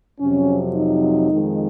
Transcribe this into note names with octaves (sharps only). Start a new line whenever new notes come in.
F2 C3 F#3 C#4
D#4
F2 D#3 G#3